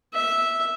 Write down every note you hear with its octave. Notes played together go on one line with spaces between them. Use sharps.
E5